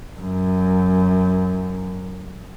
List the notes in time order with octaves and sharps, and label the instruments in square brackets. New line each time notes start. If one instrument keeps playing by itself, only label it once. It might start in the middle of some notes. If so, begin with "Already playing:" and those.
[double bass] F#2